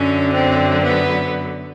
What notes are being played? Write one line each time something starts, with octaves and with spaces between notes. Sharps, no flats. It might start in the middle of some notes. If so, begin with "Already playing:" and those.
Already playing: F#2 D3 F#3 C#4
C4
B3